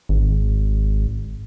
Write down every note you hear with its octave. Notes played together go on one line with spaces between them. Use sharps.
G#1